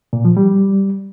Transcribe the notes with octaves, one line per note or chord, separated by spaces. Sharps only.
A#2
F3
G3